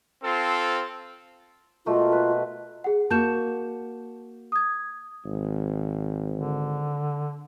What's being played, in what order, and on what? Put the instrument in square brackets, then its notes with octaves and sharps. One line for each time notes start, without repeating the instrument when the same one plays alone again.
[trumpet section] C4 F4 A4
[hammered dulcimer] B2 A3 A#3 [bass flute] F4
[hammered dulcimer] B4
[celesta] G#4 F#5
[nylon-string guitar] A#3 F#4 [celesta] A5 G6 E7
[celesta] D#6 G#6
[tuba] G#1
[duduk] D3